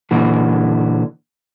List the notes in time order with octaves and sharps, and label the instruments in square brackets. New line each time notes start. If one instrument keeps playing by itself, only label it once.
[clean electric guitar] A#2 D3 E3 F#4